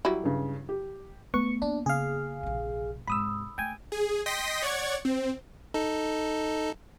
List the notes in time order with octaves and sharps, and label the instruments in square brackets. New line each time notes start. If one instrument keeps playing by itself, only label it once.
[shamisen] F#3 G3 E4
[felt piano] G2 C#3
G4
[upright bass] A3 D4 [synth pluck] B3 [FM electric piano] C#6
[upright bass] A#3 [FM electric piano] D4
[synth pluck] C#3 [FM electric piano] G#4 F5
[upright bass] A#1 C3
[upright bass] G#2 C3 [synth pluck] B5 D#6 E6
[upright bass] A3 [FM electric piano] G5 G#5
[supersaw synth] G#4
D#5 G5 C6 D#6 A#6 B6
C#5 D5 F#5 C#6 G#6
C4
[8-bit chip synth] D#4 A4